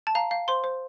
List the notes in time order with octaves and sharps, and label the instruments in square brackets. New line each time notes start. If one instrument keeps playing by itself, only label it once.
[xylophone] A5
F5 A#5
F5
C5 C6
C5